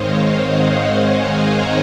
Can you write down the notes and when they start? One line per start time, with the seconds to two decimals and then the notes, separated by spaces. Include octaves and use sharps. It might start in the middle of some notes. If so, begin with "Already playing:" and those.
Already playing: G#2 D#3 G#3 C4 C5 C#5 D#5 F5
0.33 D#5 F#5
0.94 F5 G#5
1.24 F#5 A#5